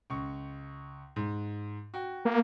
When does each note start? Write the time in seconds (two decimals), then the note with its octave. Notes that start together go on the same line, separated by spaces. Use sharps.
0.10 C#2 C#6
1.16 G#2
1.94 F#4 G5
2.25 A#3